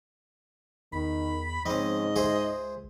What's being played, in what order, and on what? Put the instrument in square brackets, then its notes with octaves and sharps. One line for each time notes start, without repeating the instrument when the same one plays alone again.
[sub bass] E2 [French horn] D#3 [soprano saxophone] B5
[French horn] G#2 [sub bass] F3 [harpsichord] C4 C#4 [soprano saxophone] D#5
[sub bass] C#2 [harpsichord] G#4 C5 E5